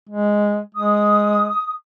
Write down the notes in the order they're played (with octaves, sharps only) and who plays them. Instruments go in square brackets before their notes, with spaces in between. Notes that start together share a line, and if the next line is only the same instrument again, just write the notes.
[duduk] G#3
[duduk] G#3 [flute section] D#6